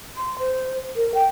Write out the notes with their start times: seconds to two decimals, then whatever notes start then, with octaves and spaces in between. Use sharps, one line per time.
0.16 C6
0.39 C5
0.96 A#4
1.14 G5